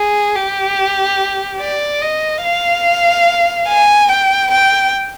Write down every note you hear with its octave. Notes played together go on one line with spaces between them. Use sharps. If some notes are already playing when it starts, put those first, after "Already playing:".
Already playing: G#4
G4
D5
D#5
F5
G#5
G5
G5